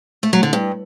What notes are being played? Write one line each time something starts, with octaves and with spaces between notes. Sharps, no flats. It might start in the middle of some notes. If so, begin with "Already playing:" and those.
A3
F#3
D3
G2